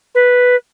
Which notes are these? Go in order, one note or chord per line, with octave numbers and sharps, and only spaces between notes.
B4